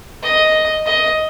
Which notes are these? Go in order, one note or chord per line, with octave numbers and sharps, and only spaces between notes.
D#5
D#5